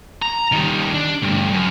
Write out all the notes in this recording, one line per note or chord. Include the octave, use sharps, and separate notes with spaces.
A#5
D#3 G3
D4
D2 G2
F#2